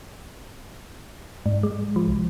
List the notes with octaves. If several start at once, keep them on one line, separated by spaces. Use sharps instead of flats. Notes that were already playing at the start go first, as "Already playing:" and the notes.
G#2
G#3
F3
C2